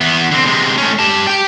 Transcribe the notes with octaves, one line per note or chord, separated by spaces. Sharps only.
E2 B3
D3 C4
C3 G#3
A3 C#4
G4 A5
G4 G5